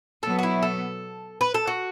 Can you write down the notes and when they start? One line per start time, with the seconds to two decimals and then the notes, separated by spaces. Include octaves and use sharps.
0.23 B2 F#3 B3 A4
0.39 F#4
0.43 E4
0.63 A4
1.41 B4
1.54 A4
1.67 F#4